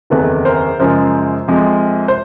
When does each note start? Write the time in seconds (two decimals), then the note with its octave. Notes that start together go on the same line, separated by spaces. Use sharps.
0.10 F#1 E2 C3 D#3 A4 B4
0.45 A#4 C5
0.79 F#2 C#3 F3 G#3 A#4 C5
1.48 F2 C3 F3 G#3
2.08 C5